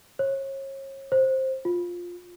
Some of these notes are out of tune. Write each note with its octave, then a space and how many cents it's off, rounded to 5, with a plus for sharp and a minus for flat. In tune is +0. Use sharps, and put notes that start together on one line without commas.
C#5 -35
C5 +10
F4 +10